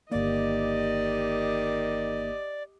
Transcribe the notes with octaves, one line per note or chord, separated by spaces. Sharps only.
G1 D#3 A#3 G4 D5 D#5